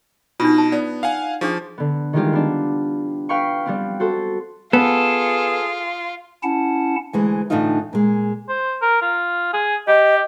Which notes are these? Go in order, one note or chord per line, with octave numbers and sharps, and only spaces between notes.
B2 D4 D#4 F4
A5
B3 D5
F5 F#5 G#5
F3 D4 G#4 C#6
D3 B3
D#3 E3 G3 G#3 F4 G4
B3 D4
B4 F5 G5 B5 C#6
G3 B3 C4
F#4 A4 C5
B3 F4 G#4 A4
C#4 E4 F#5 A5
D2 E3 G#3
A2 D3 E3 D4 D#4 F4
A#2 G#3
C5
A#4
F4
G#4
G4 D#5